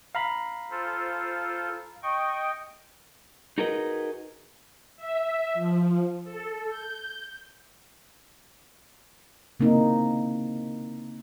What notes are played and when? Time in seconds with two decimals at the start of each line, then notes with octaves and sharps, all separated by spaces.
0.15 F5 A#5 B5
0.71 F4 A4 C5
2.03 D#5 G5 C#6
3.58 D#4 F#4 G#4 A#4 B4 D#5
4.96 E5
5.54 F3
6.24 A4
6.68 G6
9.60 C#3 A#3 C4 D#4 E4